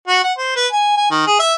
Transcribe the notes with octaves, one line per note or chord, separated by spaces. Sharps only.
F#4
F#5
C5
B4
G#5
G#5
D#3
G#4
E5